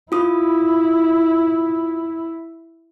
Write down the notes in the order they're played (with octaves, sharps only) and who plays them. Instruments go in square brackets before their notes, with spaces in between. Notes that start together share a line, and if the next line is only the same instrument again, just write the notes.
[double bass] E4 [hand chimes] F4 D#6